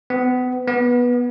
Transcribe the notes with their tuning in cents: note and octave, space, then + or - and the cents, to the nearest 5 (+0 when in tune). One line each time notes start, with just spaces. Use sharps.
B3 +30
B3 -15